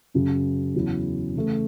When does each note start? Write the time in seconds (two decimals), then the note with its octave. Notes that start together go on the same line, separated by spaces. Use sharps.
0.14 F#2 C#3 F#3
0.74 E2 C#3 F#3 C#4 E4
1.35 C#3 E3 A3